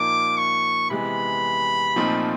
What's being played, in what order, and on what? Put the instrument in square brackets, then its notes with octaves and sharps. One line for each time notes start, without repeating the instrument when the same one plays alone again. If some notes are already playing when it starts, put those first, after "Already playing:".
Already playing: [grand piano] A#2 F3 A#3 D#4 [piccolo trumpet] D6
[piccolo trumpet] C#6
[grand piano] C3 E3 G#3 B3 [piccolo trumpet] B5
[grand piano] A#2 F3 A3 C4 D#4